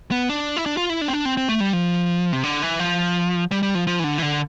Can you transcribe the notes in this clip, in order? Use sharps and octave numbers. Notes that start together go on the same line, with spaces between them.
B3
D4
E4
D4
F4
E4
D4
C4
D4
C4
C4
A3
G3
F3
C3
D3
E3
F3
G3
G3
F3
F3
E3
D3
E3
D3